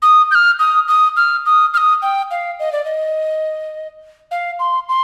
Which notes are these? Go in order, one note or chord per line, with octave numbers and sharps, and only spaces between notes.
D#6
G6
F6
D#6
D#6
F6
D#6
F6
D#6
G5
F5
D#5
D5
D#5
F5
C6
C6